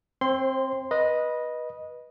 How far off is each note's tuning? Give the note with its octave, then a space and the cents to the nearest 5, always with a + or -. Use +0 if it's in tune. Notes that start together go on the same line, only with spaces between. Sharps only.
C4 +15 C5 +40 C6 -10
B4 -20 D#5 +0